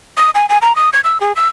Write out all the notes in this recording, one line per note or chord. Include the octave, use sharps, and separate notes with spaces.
D#6
G#5
G#5
A#5
D#6
G#6
E6
G#4
E6